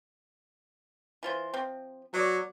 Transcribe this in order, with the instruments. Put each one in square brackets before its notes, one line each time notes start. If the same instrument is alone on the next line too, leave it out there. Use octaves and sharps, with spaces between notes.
[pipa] E3 F4 C5
F3 C4
[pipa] B2 D5 [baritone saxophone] F#3